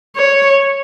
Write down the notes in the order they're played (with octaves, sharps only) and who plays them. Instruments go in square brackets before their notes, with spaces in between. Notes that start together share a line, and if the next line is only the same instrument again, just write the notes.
[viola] C#5